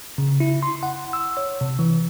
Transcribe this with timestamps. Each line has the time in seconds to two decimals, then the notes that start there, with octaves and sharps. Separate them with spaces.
0.18 C#3
0.40 E4
0.63 C6
0.83 F#5
1.13 E6
1.37 C#5
1.61 C3
1.79 E3